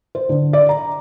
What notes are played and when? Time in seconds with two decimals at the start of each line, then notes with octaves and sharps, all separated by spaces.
0.15 C5
0.29 D3
0.53 D5
0.69 A#5